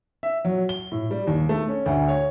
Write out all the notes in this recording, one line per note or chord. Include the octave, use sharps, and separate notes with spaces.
E5
F#3
G7
A2
G3
D#2
A3
C#4
D2
C#5